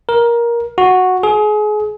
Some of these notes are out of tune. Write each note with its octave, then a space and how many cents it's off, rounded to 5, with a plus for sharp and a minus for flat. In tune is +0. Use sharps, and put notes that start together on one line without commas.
A#4 +15
F#4 -5
G#4 +30